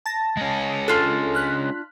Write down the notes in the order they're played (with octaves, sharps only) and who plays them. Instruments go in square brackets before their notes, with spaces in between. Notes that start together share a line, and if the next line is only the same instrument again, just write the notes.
[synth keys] A5 A6 A#6
[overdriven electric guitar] G#3 C#4
[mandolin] D4 F4 [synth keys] A4
[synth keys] F6 F#6 B6